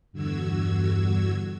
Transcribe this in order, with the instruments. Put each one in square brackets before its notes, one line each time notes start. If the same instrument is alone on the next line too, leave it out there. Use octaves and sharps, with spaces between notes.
[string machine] E2 G2 D3 F#4 E6 G#6